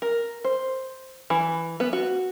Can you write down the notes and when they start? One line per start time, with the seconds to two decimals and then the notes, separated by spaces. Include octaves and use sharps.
0.02 A#4
0.44 C5
1.30 E3
1.80 B3
1.93 F#4